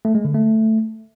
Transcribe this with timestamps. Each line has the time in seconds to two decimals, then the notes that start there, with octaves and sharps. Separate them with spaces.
0.05 A3
0.15 G#3
0.25 D3
0.35 A3